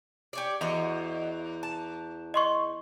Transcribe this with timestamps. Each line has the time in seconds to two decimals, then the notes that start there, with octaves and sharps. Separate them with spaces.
0.33 G4 C#5 D5
0.61 E2 F#4 D#5 E5
1.63 A5
2.34 D#5 C6 C#6